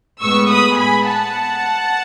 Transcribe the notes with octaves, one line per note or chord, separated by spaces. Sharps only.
A2 G#3 B3 C#6 E6
B5 D#6
G#5 B5
F#5 A5